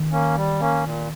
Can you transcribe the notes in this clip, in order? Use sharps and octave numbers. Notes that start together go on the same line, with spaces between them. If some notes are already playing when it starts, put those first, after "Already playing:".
Already playing: D#3
A#3 C#4
G3
A#3 C#4
A#2